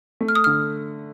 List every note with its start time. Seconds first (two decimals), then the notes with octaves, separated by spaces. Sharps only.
0.21 A3
0.29 F6
0.35 D#6
0.44 D3 F6